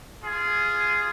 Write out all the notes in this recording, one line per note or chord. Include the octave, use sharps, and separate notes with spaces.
F4 G#4